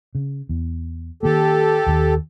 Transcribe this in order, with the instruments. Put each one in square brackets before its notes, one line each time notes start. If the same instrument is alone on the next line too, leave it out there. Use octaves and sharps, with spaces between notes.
[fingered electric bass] C#3
E2
[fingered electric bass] D#3 A#3 [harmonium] G4 A4
[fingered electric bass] D#2 D#3